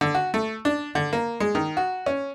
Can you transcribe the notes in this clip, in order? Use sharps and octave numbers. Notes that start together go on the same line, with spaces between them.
D3
F#4
A3
D4
D3
A#3
G#3
D#3
F#4
C#4